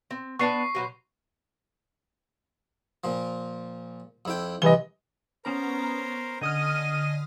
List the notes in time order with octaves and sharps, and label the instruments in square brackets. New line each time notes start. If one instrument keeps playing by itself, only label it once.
[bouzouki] C4
[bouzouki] B3 D4 A5 [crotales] C#6 C7
[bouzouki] B2 F#3 C5
[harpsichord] A#2 F3
F2 E4 G5
[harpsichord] C2 [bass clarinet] E3 [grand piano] D#5 G7
[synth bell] B3 C#4 A#5 [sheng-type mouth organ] A#4 C5
[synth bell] D3 D#6 F6 [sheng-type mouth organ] D#5 G#5